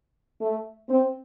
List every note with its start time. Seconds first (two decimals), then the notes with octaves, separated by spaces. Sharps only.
0.41 A3
0.89 C4